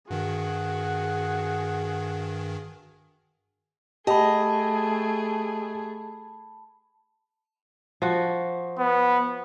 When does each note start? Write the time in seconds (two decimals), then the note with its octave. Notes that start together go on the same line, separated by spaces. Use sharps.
0.11 G2 D#3 F#4 G#4
4.07 A3 G4 G#4 D#5 A5 B5
8.02 F3 F#4
8.79 B3